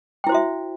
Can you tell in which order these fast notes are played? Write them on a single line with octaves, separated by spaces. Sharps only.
G5 E4 C5 F#4 E5